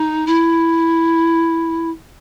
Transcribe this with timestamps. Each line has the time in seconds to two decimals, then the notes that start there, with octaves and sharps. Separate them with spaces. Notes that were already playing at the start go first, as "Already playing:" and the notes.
Already playing: D#4
0.27 E4